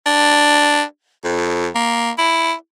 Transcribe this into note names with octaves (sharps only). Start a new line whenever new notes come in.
D4
F2
A#3
E4